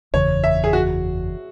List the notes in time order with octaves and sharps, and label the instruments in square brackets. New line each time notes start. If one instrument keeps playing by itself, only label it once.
[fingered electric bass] F#1 E2 C#3 E3 [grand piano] C#5
[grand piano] E5
G#4
F#4